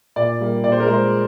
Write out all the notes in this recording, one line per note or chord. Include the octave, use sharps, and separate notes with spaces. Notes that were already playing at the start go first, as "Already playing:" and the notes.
A#2 D5
G3 A#3
A#2 D5
C5
A#4
G#3 C5